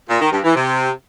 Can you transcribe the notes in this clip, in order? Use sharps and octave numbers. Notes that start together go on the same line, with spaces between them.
A#2
D#3
G2
E3
C3